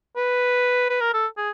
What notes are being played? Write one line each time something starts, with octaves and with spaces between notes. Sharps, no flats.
B4
B4
A#4
A4
G#4